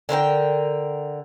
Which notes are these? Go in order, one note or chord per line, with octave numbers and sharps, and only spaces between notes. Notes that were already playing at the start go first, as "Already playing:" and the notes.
D3 A#4 B4 G5